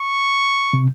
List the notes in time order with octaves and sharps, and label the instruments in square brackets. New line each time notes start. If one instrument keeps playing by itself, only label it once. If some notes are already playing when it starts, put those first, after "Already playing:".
Already playing: [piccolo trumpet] C#6
[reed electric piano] C3